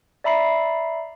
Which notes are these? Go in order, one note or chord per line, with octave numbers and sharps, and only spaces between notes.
D5 E5 A#5 B5 C7